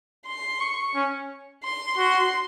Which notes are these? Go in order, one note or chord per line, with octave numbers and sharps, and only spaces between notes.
C6
C#6
C#4
C6
F#4 C6